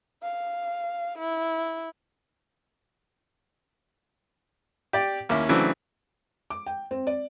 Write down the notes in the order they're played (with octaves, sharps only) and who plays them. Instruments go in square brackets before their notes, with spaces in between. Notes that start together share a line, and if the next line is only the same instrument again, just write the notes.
[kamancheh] F5
E4
[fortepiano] G4 D5
D#2 A#3 C#4 E4
C#3 E3 F#3 A3 C4 D4
[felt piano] D6
G5
C4
D5